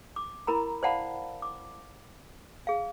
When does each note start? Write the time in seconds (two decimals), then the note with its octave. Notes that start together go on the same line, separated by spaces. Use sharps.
0.16 D6
0.47 E4 A#4 A#5 B5
0.83 C5 D5 F5 F#5 A5 B5
1.42 D6
2.67 G#4 F5